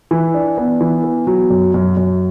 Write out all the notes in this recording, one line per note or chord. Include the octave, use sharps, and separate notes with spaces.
E3
D4
B3
E3
B3
F#3
F#2
F#2
F#2